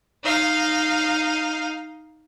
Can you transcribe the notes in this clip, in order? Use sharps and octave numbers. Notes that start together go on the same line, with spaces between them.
D#4 F5